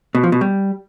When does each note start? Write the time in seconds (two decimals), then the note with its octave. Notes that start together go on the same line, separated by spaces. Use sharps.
0.15 B2
0.23 F3
0.32 B2
0.41 G3